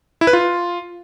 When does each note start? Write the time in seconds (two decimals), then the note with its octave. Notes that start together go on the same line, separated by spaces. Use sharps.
0.21 E4
0.27 B4
0.33 F4